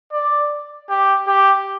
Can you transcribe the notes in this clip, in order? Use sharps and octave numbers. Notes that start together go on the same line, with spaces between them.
D5
G4
G4